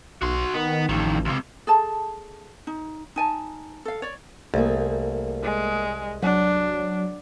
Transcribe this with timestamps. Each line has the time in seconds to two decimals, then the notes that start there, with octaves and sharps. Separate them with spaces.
0.22 B1 F#4 C6
0.54 D#3 B3
0.89 A1 F2 D#3
1.25 C#2 C3
1.67 G#4 A4 A5
2.67 D#4
3.16 D#4 G#5 A5
3.85 A4 F5
4.02 C#5 D5
4.54 C2 A3 A#3 G#4
5.43 G#3
6.22 F#3 D4 F#5